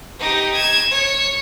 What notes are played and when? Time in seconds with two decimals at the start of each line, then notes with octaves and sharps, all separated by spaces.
0.20 D#4 G4
0.54 G#6 E7
0.92 C#5